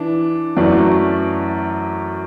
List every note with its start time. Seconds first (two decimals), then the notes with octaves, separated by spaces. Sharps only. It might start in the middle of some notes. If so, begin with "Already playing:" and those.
Already playing: E3 D4
0.57 F#2 E3 A3 F#4 D5